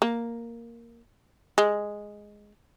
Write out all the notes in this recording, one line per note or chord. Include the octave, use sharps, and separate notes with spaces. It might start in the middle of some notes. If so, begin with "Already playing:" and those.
A#3
G#3